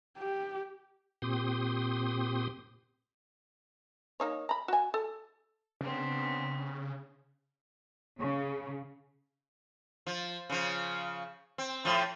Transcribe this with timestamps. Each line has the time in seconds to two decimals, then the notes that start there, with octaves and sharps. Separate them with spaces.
0.18 G4
1.22 A#2 C4 G4 C6 D#6
4.20 A#3 D#4 C#5
4.49 A#5 B5
4.68 F#4 G#5
4.94 A4
5.81 C#3 B3 C4 D4
8.19 C#3
10.07 F3
10.50 C#3 F3
11.58 C4
11.85 A2 F3